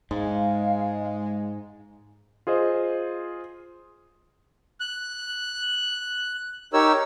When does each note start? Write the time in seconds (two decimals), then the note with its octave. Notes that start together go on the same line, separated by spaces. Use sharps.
0.11 G#2 G#3 F5
2.47 F4 G#4 C5 D#5
4.80 F#6
6.73 D#4 G4 A#4 C#5 E6